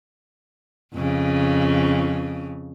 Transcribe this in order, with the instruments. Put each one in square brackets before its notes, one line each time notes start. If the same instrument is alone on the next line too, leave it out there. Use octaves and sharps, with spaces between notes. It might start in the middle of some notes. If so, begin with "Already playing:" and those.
[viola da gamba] F2 C#3